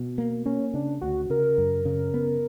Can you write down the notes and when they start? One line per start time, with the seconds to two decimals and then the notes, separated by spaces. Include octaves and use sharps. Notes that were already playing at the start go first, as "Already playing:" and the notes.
Already playing: B2
0.18 A#3
0.45 A#3 C#4
0.74 C#3 D4
1.01 D2 F#4
1.30 C#3 A#4
1.58 F#2
1.85 C#3
2.14 B3